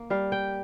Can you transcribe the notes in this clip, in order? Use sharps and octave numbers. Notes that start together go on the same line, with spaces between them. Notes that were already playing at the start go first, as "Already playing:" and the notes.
Already playing: A#3
G3 F5
G5